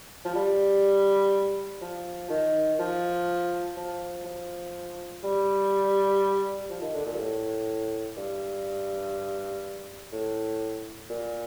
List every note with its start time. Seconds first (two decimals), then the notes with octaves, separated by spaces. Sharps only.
0.25 F3
0.35 G3
1.82 F3
2.30 D#3
2.79 F3
3.77 F3
4.26 F3
5.24 G3
6.70 F3
6.82 D#3
6.95 D3
7.06 A#2
7.14 G2
7.19 A2
8.17 G2
10.12 A2
11.10 A#2